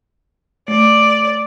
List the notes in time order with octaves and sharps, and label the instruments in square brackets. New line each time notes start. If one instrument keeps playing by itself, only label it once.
[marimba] A3 [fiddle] D5